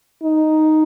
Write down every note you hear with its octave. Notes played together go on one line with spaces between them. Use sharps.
D#4